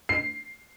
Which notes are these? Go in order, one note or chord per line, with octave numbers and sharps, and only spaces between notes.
C7